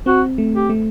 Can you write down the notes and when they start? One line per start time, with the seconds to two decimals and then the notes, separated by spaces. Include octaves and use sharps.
0.06 C4 F#4
0.38 A3
0.55 G4
0.70 A3